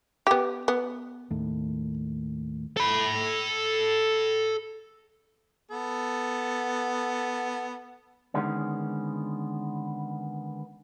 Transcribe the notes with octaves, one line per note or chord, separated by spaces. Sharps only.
B3 G4
B3
D#2 A2
A4 B5
B3 A4
D3 D#3 G#3 B3 C#4